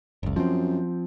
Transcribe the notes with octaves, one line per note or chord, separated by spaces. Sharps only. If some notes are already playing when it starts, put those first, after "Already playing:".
F#1 C#2
F#2 F3 C4